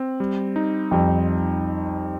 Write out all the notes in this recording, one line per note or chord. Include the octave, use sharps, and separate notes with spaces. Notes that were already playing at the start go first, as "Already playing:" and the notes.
Already playing: C4
G3
D#4
F2 G3